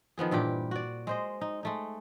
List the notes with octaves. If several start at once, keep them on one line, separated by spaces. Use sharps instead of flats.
D#3 F3 B3 G#4
G2 A#2 E3 G4
F#4 D5
G#3 C5 D#5
D#4
G#3 A3 D#4